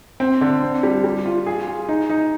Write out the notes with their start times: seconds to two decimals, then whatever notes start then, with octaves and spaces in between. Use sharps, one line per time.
0.20 C4
0.41 D3
0.63 C4
0.83 G3
1.04 G3
1.26 F4
1.46 G#4
1.67 G#4
1.89 D#4
2.10 D#4